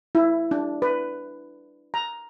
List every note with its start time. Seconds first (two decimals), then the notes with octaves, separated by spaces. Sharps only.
0.15 E4
0.51 D4
0.82 B4
1.94 A#5